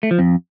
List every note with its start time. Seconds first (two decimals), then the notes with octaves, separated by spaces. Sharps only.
0.03 A3
0.11 F3
0.19 F2